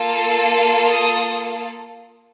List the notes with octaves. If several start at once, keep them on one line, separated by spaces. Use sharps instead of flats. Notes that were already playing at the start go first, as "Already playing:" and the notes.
Already playing: A#3 F4 A4
D#6